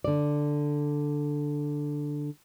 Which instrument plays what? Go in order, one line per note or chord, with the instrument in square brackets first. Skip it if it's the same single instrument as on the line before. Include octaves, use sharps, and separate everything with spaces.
[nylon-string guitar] D3 D5